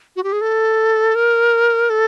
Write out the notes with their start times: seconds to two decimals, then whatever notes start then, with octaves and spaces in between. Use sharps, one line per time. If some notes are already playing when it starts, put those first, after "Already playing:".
0.16 F#4
0.24 G4
0.32 G#4
0.41 A4
1.15 A#4
1.90 A4